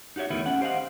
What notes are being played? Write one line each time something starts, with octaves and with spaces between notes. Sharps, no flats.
D#4 F#4 G4 C#5 E5
E2 D#3 A3 B3 E4
C#4 F#5
G4 C5 D#5 F5 F#5